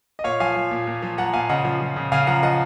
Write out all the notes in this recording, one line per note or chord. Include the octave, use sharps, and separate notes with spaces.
D#5
A#2 C#5 F5
F3 F5 G#5
F3
A#2
A#2
F3
F3 F#5 A#5
A#2 F5 G#5
C#3 D#5 F#5
F3
F3
C#3
C#3 F5 G#5
F3 F#5 A#5
F3 D#5 F#5